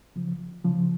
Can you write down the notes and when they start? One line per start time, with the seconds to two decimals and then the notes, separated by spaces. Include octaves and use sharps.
0.16 C#3 F3
0.64 C#3 F3